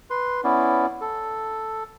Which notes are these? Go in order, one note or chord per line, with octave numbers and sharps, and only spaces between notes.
B4 C6
B3 C#4 E4 D5
A4